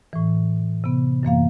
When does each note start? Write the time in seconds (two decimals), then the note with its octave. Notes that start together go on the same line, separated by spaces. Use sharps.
0.13 A2 E3
0.84 C3 B3
1.23 F#2 E3 A#3 F5